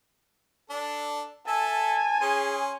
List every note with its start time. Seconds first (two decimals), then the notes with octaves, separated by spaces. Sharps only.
0.70 D4 A4
1.47 A4 E5 G#5 A5
2.21 C#4 G#4 C6